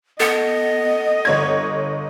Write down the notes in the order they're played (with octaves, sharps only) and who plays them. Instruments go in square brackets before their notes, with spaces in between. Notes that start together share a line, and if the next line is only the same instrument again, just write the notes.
[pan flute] B3 [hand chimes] A4 [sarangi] D#5
[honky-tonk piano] G1 C#5 G#6